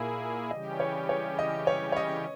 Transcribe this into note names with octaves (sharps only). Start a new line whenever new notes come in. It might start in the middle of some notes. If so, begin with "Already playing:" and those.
Already playing: A#2 A#3 E4 G#4
C#3 E3 G3 C#4 G4 D#5
C#5
C#5
D#5
C#5
C#5
D#5